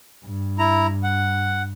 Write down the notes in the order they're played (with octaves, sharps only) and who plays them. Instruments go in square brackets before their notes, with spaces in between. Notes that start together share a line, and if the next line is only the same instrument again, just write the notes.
[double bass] G2
[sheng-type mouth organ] E4 A#5
F#5